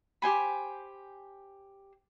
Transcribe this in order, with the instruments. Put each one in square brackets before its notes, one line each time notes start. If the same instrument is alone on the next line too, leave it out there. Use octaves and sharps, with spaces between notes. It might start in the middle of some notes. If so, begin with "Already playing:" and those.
[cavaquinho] G4 C5 G#5 B5